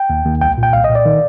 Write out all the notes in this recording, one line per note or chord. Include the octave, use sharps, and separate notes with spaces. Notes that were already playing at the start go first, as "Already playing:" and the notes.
Already playing: G5
D#2
D#2
C2 G5
A#2
G5
C2 F5
D#5
A#2
D5
D#3